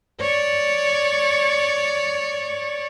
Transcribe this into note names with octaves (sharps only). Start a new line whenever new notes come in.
C#5 D5